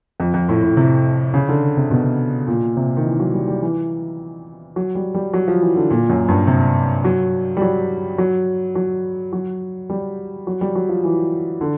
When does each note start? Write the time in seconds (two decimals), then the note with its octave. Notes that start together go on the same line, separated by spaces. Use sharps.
0.20 F2
0.34 F2
0.49 A2
0.62 A2
0.77 C3
1.34 C#3
1.49 D3
1.77 C3
1.91 B2
2.48 A#2
2.77 C3
2.97 D#3
3.05 E3
3.20 F#3
3.34 G3
3.48 G3
3.62 E3
4.76 F#3
4.95 G3
5.14 G3
5.33 F#3
5.48 F3
5.62 E3
5.76 D3
5.91 A#2
6.09 F#2
6.28 G2
6.47 C3
7.05 F#3
7.57 G3
7.62 F#3
8.18 F#3
8.75 F#3
9.33 F#3
9.90 G3
10.47 F#3
10.61 G3
10.75 F#3
10.89 F3
11.04 E3
11.61 D3